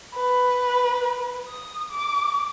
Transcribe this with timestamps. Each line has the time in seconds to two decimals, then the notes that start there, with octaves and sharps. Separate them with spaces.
0.15 B4
1.48 D#6
1.91 D6